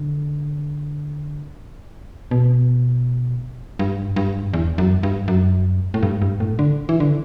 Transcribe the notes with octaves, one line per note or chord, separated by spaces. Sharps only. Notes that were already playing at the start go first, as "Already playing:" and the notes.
Already playing: D3
B2
G2
G2
E2
F#2
G2
F#2
A2
G2
G2
A2
D3
E3
D3